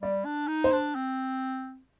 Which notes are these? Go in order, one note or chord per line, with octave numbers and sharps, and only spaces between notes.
G3 D5
D4
D#4
C5
D4
C4